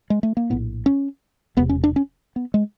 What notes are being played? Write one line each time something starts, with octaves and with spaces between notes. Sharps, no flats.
G#3
A3
A#3
A#1 A2 B3
C#4
E1 E2 C3 B3
C#4
D4
C#4
B3
G#3